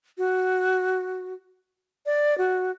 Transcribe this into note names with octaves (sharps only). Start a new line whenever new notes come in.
F#4
D5
F#4